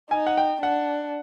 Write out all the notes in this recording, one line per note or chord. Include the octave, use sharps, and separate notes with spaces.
D#4 G#5
F#5
G5
D4 F#5